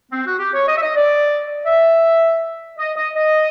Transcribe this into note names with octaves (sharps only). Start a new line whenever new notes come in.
C4
F#4
G4
C#5
D#5
E5
D#5
D5
E5
D#5
D#5
D#5